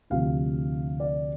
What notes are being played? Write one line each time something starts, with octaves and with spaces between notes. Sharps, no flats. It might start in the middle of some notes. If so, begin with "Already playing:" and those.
D2 C3 F3 F5
D5